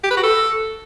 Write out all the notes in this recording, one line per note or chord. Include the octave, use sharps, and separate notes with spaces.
G4
B4
F#4
A4